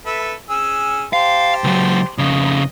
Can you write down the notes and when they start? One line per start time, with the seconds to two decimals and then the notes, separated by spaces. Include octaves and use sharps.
0.06 A4 B4 E5
0.50 C#4 G#4 E6
1.13 G4 C5 F5 A5
1.64 C#2 F#3
2.18 F2 C#3 D#5